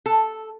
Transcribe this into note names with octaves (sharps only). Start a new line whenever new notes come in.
A4